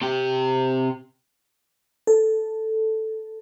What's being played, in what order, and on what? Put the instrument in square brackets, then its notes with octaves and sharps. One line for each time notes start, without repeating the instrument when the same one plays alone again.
[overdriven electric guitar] C3 G4
[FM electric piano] A4